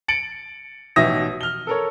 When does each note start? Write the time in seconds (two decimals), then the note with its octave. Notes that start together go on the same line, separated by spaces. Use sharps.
0.08 A6 C#7 D7 F#7
0.96 A1 B2 D#4 E5 D#6 A#6
1.41 F6 G7
1.67 A4 A#4 C#5